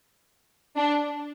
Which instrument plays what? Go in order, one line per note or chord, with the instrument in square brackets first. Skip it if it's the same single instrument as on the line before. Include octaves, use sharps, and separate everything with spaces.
[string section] D4